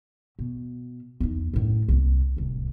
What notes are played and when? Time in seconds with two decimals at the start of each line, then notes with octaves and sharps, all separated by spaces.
0.39 B2
1.20 E2 D#4
1.54 F#2 A2
1.88 C2 A#3
2.37 D1 C2